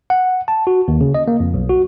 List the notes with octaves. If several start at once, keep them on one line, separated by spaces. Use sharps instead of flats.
F#5
A5
F#4
D#2
C#3
D#5
A#3
F2
B1
F#4